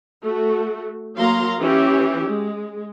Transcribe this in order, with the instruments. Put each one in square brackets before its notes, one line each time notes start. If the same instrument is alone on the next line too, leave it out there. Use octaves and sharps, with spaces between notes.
[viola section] A3 F#4
F#3 A#3 F5 A#5 C6
E3 C#4 G4 E5
G#3